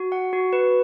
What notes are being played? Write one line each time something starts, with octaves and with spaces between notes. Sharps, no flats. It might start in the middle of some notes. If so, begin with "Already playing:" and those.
Already playing: F#4
F#5
F#4
B4